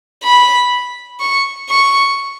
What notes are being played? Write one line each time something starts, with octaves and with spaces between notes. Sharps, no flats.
B5
C#6
C#6